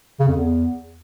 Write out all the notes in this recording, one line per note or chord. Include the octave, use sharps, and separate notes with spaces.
C#3
F2
E2